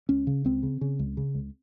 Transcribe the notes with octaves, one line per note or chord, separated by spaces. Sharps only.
C#2 C#4
C#3
C#2 C4
C#3
C#3
C#2
C#3
C#2